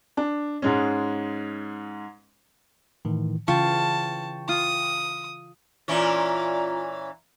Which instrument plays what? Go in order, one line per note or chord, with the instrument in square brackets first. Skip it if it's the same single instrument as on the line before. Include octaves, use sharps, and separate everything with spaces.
[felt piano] D4
G#2 G#3 C#4
[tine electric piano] A2 D#3 E3
[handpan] C#3 E3 [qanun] F4 [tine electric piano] G5 C#6 [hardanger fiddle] A5
[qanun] F4 [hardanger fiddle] D#6
[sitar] A#2 E3 C#4 [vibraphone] F4 D5 A#5